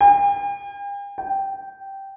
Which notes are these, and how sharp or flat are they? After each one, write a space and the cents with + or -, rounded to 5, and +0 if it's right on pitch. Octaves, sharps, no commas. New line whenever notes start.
G5 +45
G5 -10